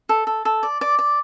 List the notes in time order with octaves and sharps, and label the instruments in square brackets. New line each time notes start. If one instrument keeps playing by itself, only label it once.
[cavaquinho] A4
A4
A4
D5
D5
D5